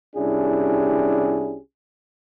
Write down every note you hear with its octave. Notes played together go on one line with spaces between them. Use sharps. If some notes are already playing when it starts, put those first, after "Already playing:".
C2 C#4 D4 E4 G4 G#4